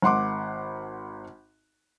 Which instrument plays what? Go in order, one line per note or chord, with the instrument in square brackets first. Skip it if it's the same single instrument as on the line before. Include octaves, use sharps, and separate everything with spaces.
[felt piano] G#1 F#5 C6 D6